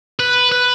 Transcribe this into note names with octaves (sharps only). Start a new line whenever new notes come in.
B4
B4